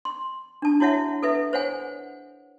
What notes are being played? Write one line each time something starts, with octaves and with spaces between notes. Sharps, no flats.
C6
D4 A5
E4 F#4 C#5 E5 F#5
A4 B4 E5
C5 C#5 F#5 G#5